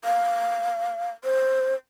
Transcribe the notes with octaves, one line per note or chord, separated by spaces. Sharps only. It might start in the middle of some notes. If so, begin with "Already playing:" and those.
F5
C5